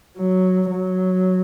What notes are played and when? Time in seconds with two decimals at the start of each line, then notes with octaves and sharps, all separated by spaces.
0.18 F#3
0.70 F#3